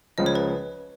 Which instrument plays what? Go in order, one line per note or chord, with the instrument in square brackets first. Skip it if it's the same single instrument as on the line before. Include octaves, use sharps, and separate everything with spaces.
[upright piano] C#2 C#3 F3 [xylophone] D#5
[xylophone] C#5
B4